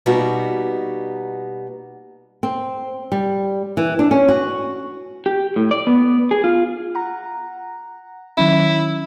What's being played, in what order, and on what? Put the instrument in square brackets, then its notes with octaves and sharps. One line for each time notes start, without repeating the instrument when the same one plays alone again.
[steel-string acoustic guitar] B2 G3 A#3 B3 D#4 F#4
[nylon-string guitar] C4
G3
E3
D4
C#4
F#4
[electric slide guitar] G4
A2
D5
B3
G#4
F4
[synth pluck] F#5 A#5
[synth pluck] D#3 F#3 C#4 [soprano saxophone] E4